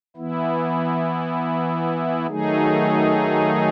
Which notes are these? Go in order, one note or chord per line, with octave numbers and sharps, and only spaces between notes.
E3 B3 E4
D#3 F#3 A3 D#4 G#4